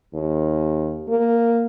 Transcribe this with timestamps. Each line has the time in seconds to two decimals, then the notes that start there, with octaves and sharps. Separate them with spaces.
0.14 D#2
1.09 A#3